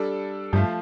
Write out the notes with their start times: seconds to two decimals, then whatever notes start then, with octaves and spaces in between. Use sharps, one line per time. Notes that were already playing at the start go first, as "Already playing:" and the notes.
Already playing: G3 D4 A4
0.53 G2 F3 A3 F4